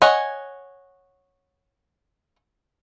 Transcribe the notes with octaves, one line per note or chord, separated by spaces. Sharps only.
C#5 D#5 F#5 G#5